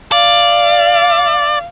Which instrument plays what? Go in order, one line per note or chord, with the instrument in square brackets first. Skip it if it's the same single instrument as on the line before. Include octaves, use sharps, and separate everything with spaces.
[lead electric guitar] D5 [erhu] F5